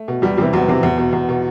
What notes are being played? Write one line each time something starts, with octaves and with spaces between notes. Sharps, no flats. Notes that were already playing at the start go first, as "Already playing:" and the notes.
Already playing: A3
B2
E2 G3
C3 E3 G3
E2 F#3
C3 E3
E2
B2
E2
B2